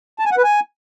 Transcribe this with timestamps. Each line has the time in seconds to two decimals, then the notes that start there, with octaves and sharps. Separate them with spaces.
0.19 A5
0.25 G#5
0.32 F#5
0.38 B4
0.44 G#5